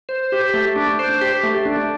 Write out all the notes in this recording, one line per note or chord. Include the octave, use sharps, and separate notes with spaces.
C5
G4
A3
D4
C5
G4
A3
D4